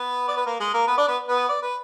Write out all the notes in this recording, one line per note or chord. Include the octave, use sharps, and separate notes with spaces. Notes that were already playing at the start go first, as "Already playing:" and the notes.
Already playing: B3 B4
D5
B4
A#3 A#4
G#3 G#4
A#3 A#4
B3 B4
D4 D5
B3 B4
B3 B4
D5
B4